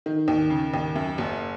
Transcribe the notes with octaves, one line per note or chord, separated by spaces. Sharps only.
D#3
D#2
C#3
D#2
F#2
F#1